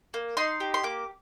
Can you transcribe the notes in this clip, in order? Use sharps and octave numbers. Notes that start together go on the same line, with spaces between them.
A#3
D#4 C6
G4
C6
A#3 D6